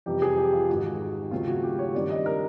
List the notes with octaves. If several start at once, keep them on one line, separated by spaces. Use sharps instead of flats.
F2 C3 E3 G3 G4
G#4
G4
F4
G#1 G#2 D#3 F#4
G4
D#2 C#3 F#3 A3 C4 F4
F#4
G4
C#5
G2 D#3 G3 C4 D5
D#5
A#4